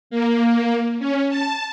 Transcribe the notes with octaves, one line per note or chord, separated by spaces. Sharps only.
A#3
C#4
A5